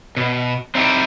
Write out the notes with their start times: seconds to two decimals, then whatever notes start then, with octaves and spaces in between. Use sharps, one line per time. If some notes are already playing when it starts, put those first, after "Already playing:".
0.17 B2
0.75 C4 D#4 E4 F#4 G4